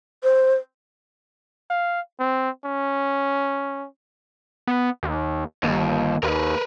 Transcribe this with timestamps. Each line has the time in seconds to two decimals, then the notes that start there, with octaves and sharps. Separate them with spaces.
0.23 C5
1.70 F5
2.19 C4
2.65 C#4
4.67 B3
5.03 D#2
5.63 G1 D#2
6.23 D#2 A#4 B4